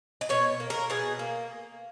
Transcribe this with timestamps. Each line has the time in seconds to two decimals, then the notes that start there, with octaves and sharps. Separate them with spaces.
0.21 D#5
0.29 B2 C#5
0.60 A#3
0.70 A#4
0.90 B2 G#4
1.19 A#3